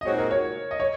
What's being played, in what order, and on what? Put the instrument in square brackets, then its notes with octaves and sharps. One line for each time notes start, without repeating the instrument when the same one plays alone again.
[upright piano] D#5
[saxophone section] A#2 G#3 C4 D#4 F#4 [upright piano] C#5
[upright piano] A#4
C#5
D#5
C#5